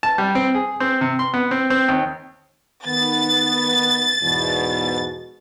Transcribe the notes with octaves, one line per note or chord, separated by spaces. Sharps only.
A5
G3
C4
G#4
C4
C3
C6
B3
C4
C4
D#2
D#3 B3 A6
E2 G#2 B2